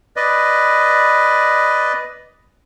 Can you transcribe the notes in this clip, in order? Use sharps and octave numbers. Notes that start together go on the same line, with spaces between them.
B4 D5 D#5